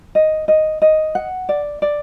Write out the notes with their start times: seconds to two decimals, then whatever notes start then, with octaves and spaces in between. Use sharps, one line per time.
0.15 D#5
0.48 D#5
0.82 D#5
1.15 F#5
1.49 D5
1.82 D5